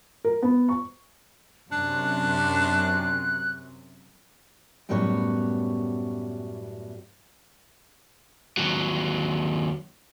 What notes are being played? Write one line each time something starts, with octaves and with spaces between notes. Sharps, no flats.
A#4
B3
C#6
F#2 C3 D4 F#6
F#2 A2 G3 B3 F#4 C#5
D#2 F#3